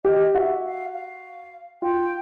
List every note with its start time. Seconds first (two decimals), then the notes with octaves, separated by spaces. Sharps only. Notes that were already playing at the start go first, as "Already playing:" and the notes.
0.05 G4 D#5
0.34 F#4 E5
0.64 F5
0.94 F5
1.82 F4 G5